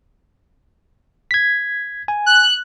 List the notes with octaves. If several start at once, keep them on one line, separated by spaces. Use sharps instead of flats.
G#6 B6
G#5
F#6